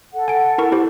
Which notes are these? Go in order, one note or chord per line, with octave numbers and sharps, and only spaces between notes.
A4 F#5
G#5 D7
E4 A#4 C#6
E4 G4 C5